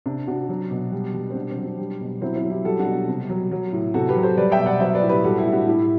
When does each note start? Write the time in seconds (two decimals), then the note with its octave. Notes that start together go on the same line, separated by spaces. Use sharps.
0.06 C3 D4
0.27 C3 D4 F#4
0.49 F#3
0.71 B2
0.92 G3
1.14 G3
1.30 C4
1.35 B2 D4
1.50 C4
1.57 F#3
1.64 D4
1.78 G3
2.00 B2
2.21 F#3 C4 E4
2.36 C4 E4
2.43 F#3
2.50 E4 G4
2.65 G3 F#4 A4
2.79 D4 F#4
2.86 B2
3.08 C3
3.29 F#3
3.51 F#3
3.73 A2
3.94 C3 F#4 A4
4.09 G4 B4
4.16 F#3
4.23 A4 C5
4.37 G3 B4 D5
4.52 E5 G5
4.59 B2
4.66 D5 F#5
4.80 F#3 C5 E5
4.94 B4 D5
5.02 A2
5.09 G4 B4
5.24 G3 F#4 A4
5.38 E4 G4
5.46 A2
5.52 D4 F#4
5.66 A2 E4 G4